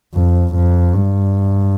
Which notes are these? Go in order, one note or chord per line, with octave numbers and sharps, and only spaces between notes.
F2
F2
G2